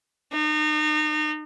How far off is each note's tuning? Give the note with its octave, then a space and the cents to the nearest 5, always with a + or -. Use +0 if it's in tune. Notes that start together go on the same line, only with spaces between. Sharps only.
D#4 -35